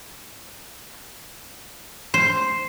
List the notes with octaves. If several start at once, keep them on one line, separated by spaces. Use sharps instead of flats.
C5